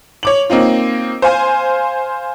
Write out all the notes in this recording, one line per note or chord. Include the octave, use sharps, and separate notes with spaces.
C#5 D6 F#7
A#3 C4 D#4 F4
C5 F5 G#5